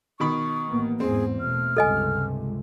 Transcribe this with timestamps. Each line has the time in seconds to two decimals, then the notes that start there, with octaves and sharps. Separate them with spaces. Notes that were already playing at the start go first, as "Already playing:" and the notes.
0.20 B2 D#3 B5 C#6
0.67 A1 A#3 B3
1.00 E2 G#2 C4 G#4
1.40 B2 A3 F6
1.77 C#2 G2 C3 A4 D#5 G#5